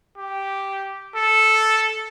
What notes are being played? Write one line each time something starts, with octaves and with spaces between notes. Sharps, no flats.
G4
A4